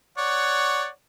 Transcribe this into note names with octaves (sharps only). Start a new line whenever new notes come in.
C#5 D5 F#5